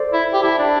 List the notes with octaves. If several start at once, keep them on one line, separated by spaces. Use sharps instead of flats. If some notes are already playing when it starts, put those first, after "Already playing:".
Already playing: A4 C5 D5
E4
G4
E4 A5
D4